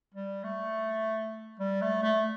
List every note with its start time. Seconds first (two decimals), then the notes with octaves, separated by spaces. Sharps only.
0.14 G3
0.44 A3
1.59 G3
1.82 A3
2.03 A3